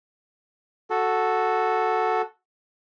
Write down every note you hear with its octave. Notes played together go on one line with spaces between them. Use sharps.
F#4 A4